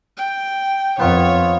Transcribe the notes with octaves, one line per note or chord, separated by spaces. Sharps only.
G5
F2 D#3 B3 F4 C#5